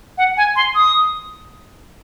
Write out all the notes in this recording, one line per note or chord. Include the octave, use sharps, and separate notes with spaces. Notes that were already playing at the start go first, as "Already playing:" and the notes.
F#5
G#5
C6
D#6